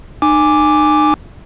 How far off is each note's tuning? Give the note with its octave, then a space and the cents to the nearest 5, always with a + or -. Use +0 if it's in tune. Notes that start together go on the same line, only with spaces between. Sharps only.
D#4 -40 G#5 -5 D6 +0